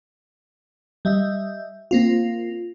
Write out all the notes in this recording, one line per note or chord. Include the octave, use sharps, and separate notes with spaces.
G3 D#5 E5
A#3 C4 F4